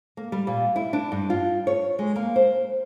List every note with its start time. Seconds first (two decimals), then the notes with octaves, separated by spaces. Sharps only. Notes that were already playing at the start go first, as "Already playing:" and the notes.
0.17 A#3
0.32 G3
0.47 A#2
0.76 E4
0.93 D4
1.12 G2
1.30 F4
1.67 C#5
1.99 G#3
2.16 A#3
2.36 C5